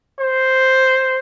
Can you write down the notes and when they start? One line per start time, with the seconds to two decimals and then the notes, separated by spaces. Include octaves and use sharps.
0.19 C5